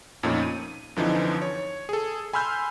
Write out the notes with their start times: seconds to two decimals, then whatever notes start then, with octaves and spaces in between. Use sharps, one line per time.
0.23 F2 A#2 A3 C#4 D#4
0.43 D#7
0.96 F#2 D3 E3 F3 C4 D#4
1.42 C#5
1.89 G#4 A4
2.33 G#5 B5 C6 E6 F6 G6